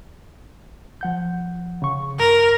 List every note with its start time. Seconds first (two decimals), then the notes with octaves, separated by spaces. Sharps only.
1.01 F3 F#5 G6
1.82 C#3 C#6
2.19 G2 A#4